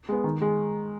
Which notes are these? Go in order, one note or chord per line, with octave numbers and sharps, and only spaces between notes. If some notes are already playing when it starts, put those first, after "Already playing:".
G#3 B3
D#3
G#3